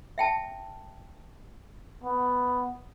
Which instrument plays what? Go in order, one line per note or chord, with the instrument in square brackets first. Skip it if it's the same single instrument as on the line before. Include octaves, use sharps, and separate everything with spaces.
[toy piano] E5 G5 A5
[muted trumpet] B3